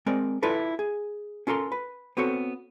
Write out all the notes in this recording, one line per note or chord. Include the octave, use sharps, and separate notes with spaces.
G#3 C4 A#4 D5
E4 F4 A4 B4 D5
G#4
C#4 F4 A4 A#4 C6
B4
B3 C4 F#4 A4 C#5